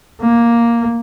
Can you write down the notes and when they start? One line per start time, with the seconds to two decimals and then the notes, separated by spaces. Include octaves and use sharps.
0.21 A#3